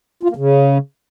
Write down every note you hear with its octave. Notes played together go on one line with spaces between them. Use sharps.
F4
A#3
C#3